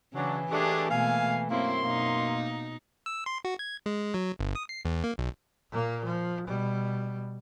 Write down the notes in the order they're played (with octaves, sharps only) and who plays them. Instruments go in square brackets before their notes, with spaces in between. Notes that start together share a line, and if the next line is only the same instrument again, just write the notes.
[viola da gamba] C#3 [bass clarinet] E3 [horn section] F#3 D4
[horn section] G#3 A3 D4 [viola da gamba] G4 G#4
[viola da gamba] B2 A3 A#3 [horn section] F5 G#5
[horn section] F#2 C6 [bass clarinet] A#3 [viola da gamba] C4 E4
[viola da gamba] B2 D#4 [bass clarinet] A#3
[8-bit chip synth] E6
C6
F#4
G#6
G#3
F#3
G1
D#6
C7
E2
A#3
B1
[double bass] A#2 A#3
F3
B2 G3